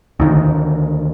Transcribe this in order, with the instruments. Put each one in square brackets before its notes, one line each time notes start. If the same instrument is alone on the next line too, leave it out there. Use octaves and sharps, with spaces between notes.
[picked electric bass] D2 D#3